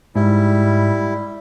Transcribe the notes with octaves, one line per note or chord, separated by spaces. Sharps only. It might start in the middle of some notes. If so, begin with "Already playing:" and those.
G#2 G3 E4